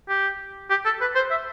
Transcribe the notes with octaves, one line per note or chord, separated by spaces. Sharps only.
G4
G4
A4
B4
C5
E5